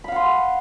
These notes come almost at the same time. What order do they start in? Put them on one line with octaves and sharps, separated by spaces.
B5 F5 F#5 C6